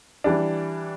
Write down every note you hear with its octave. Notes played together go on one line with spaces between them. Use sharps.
E3 G3 D4